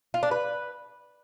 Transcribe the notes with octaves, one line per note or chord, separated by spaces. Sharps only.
F4
D4
B4